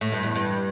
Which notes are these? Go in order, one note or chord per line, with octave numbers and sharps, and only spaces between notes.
A2
G2
E2
G2